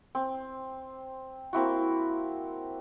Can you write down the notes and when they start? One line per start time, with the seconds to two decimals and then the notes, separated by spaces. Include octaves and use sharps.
0.15 C4
1.53 A#3 C4 E4 F#4